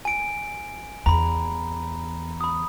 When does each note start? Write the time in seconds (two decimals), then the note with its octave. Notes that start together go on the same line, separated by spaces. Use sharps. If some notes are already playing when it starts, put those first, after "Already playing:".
0.05 G#5 D7
1.06 E2 A#5 B5
2.41 B5 D#6